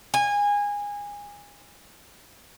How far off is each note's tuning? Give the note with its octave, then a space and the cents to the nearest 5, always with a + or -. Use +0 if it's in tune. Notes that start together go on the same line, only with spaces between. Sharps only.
G#5 -20